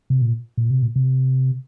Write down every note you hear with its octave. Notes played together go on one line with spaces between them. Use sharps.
C3
A#2
A#2
C3
A#2
C3